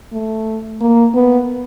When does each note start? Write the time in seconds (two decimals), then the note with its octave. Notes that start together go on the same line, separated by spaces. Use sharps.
0.12 A3
0.81 A#3
1.14 B3